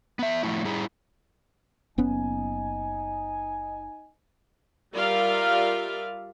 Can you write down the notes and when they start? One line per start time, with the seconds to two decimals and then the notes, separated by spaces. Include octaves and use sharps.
0.19 B3 E5
0.43 F3 A3 E4
0.65 G3 E4 G#4
1.98 F#1 B3 C#4 D#4 G#5
4.95 G3 F4 A#4 D5 E5 F5